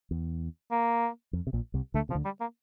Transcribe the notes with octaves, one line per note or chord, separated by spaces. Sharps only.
E2
A#3
F2
C3
A#1 A#2
C2 C3
D2 D3 A3
C3 F3
D2 D3
G3
A#3